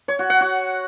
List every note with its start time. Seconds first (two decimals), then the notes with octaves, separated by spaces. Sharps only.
0.08 C#5
0.19 F#4
0.30 F#5
0.41 F#4